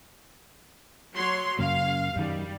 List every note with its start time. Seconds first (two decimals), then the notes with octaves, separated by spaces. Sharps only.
1.14 F#3 C#5 C6
1.59 F#2 C#3 A#3 F5
2.16 F#2 D#3 G3